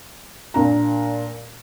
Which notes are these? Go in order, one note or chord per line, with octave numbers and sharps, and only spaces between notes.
A#2 D4 A#5